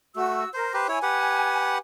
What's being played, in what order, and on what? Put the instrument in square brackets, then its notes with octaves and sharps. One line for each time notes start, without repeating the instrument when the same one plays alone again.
[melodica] A3 [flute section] F#4 E6
[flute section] A#4 [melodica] C5
[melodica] G4 B4 C5
[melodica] E4 C#5 [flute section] G#5
[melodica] G4 B4 F#5